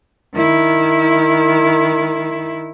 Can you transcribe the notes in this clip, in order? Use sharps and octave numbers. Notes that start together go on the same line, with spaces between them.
D#3 E4